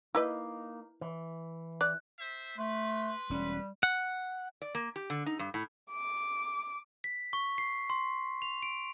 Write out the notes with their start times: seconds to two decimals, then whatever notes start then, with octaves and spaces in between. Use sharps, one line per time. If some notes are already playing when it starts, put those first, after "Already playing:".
0.15 A#3 D#4 E4 B4 D#5
1.01 E3
1.81 D5 F#6
2.19 C5 E5
2.58 A3 B4 C6
3.30 E1 G3 C#4
3.83 F#5
4.62 D5
4.75 A#3
4.96 G4
5.10 D3
5.26 D#4
5.39 G2
5.54 A2
5.92 D6
7.04 B6
7.33 C#6
7.58 C7
7.90 C6
8.42 F7
8.63 D7